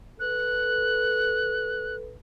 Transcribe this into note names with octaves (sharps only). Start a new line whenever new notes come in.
A4 B4 F#6